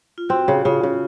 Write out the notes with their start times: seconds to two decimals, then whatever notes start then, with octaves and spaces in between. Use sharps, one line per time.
0.18 F4
0.29 C4 F#4
0.48 C#3
0.65 C#3 F4
0.83 C#3